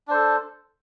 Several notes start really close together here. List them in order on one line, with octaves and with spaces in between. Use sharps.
D4 C5 A4